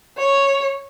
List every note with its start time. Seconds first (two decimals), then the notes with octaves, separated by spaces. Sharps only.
0.18 C#5